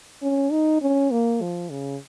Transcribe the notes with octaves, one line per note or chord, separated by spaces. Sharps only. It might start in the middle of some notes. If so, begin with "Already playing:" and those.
C#4
D#4
C#4
A#3
F3
C#3